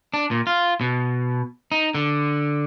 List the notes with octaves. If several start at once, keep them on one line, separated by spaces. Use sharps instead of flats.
D4
A#2
F4
B2
D#4
D3